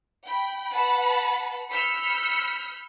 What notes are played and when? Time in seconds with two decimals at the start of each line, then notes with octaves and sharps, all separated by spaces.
0.25 G5 B5
0.71 B4 F#5 A5 B5
1.69 B5 E6 F6 G6 B6 C#7